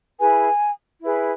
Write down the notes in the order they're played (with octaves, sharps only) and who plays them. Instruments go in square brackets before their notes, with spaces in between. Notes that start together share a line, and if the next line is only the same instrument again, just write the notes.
[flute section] E4 G#4 B4 G#5
E4 G#4 B4